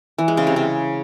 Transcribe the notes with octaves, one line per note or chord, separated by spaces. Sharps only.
E3
G#3
C#3
C3
C#3